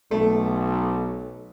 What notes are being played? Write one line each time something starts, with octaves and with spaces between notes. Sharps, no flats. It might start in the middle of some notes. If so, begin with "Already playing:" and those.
B1 A3